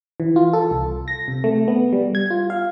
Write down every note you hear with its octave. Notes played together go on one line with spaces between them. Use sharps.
E3
F4
A4
C2
A#6
C3
A3
B3
G3
G#6
F4
F5